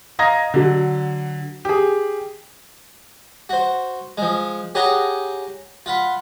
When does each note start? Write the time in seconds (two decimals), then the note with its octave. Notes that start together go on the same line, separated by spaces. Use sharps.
0.19 D#5 F5 A#5 G#6 A#6
0.54 D3 F#3
1.65 G4 G#4
3.49 F#4 C5
4.18 F3 G#3
4.75 G4 G#4 C#5 F#5 G5 A#5
5.86 F4 F#5 B5